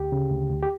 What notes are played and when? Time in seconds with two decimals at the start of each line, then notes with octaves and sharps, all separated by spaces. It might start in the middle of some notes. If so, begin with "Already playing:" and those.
Already playing: D2 G4
0.12 C#3
0.31 D2
0.50 D2
0.63 G4